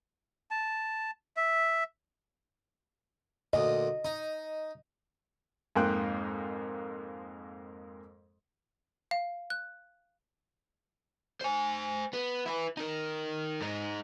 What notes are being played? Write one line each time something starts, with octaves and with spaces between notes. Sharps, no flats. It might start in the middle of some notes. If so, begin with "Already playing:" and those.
A5
E5
D2 A#2 D#5
D#4
F2 G#2 A#3 G5 C6 F#6
F5
F#6
C5 G#5
B3
E4 B4
D#4 A#4
G#2 D#4